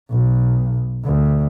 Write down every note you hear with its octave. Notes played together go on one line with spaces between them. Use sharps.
B1
D2